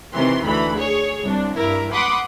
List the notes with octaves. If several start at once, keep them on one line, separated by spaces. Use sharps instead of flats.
C3 D#3 E3 C6
D2 E3 B5
G#4 C#5
C2 D4
G2 E4 A#4
F#5 B5 C6 D6 D#6